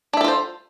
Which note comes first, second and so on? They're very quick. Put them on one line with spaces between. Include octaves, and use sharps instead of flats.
D4 E5 A4 F4 C5